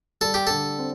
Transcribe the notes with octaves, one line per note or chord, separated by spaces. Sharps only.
G3 A4
G4
D3 A4
C4